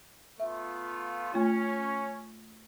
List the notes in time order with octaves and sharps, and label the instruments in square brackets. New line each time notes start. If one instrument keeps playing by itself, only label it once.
[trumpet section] A3 B3 F4 [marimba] E5
[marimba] A3 F4 [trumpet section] C#4